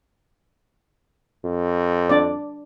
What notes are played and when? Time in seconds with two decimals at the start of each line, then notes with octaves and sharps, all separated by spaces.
1.45 F2
2.10 D4 D5